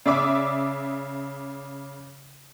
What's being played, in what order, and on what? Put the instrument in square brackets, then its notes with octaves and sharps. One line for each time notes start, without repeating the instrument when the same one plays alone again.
[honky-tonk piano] C#3 D5 E5 D6 D#6